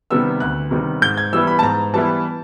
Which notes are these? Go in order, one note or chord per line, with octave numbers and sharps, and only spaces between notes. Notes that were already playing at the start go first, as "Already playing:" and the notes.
C3 D#3 G3 B3 E6
D2 F#6
C3 D#3 G3 B3
G#2 G6
G#6
E3 G3 B3 E4 E6
B5
A5
G#2 A#5
E3 G3 B3 E4 A5